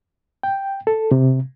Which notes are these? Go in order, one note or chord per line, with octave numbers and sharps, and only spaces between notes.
G5
A4
C3